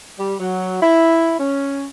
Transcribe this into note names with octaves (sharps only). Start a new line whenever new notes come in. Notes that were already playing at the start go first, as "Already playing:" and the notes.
G3
F#3
E4
C#4